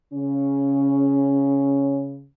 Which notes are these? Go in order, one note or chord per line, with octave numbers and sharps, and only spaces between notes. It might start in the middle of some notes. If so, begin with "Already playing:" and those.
C#3 C#4